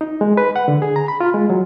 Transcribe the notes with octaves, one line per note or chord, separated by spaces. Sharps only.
D#4
G#3
B4
F#5
D3
G#4
A#5
B5
F4
G#3
F#3